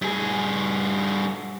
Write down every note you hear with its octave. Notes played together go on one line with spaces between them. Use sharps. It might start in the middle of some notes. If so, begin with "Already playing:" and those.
G2 G#4